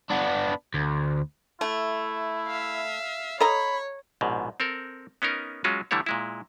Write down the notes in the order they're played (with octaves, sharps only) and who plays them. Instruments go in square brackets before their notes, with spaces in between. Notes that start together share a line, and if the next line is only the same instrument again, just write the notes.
[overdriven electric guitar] B3 D4
D2
[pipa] A3 [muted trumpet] E4
[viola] E5 F5
[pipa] A4 D#5 A#5 [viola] C#5 [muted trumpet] B5
[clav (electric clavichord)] A#1 G#2 B2
C4 A4 A#4
B3 C#4 D#4 A#4
F#3 G#3 C#4 F4 F#4
D3 E3 G3 A3 E4 C#5
A#2 G#3 E4